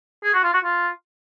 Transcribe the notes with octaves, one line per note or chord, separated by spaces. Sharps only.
G#4
F#4
F4
F#4
F4